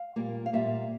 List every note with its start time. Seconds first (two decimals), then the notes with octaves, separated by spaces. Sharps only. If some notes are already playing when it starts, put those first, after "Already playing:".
Already playing: F5
0.16 A#2 G3 A#3
0.46 F5
0.53 A#2 G3 A#3 E5